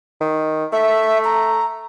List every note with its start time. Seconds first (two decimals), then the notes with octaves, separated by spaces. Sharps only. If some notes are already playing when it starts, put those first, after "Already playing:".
0.21 D#3
0.72 A3 E5
1.25 A#5